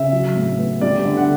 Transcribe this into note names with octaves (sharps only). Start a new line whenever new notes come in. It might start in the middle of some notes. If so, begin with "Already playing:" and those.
Already playing: C#3 E5
F#3
A2
B3
G3 D5
D3
F#5